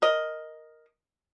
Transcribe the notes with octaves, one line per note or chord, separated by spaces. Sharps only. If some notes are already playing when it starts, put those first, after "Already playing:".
A#4 D#5